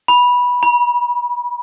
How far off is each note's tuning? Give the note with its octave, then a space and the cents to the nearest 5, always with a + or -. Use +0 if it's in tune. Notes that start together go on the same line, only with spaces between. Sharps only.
B5 -15
B5 -40